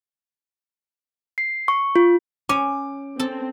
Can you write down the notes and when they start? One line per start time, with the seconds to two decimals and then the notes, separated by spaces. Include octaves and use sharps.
1.38 C7
1.68 C#6
1.96 F4
2.49 C#4 D6
3.20 C4 A4